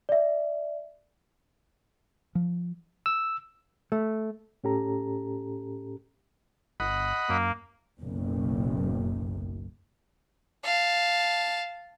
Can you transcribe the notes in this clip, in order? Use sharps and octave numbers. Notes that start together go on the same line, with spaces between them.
D5 E5
F3
E6
A3
A2 C#4 G4 A4 A#5
G1 D#5 F#5 B5
F#2 A#3
F#1 B1 F#2 A2
F5 A5